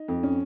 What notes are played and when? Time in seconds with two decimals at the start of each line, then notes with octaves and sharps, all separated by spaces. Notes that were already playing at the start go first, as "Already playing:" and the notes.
Already playing: D#4
0.08 F2
0.23 C#4